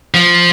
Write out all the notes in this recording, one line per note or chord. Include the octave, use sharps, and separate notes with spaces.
F3